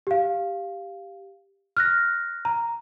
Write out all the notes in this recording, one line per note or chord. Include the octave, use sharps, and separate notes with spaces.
G4 F5
F6 F#6 A#6
A#5